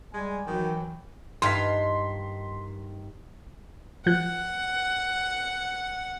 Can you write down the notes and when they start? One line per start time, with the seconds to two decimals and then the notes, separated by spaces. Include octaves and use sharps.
0.14 G3 G#3 G#5
0.46 D#3 E3 F#3 G5
1.42 G2 D#3 F4 F5 C6 B6
4.06 F3 F#5 F#6